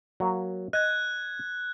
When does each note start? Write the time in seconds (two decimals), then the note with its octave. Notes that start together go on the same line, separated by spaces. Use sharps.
0.20 F#3 A#3
0.73 D#5 F#6 G#6